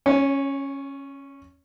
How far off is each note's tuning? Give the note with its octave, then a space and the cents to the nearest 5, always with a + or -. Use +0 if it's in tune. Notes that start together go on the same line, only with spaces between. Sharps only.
C#4 -10 C#5 +30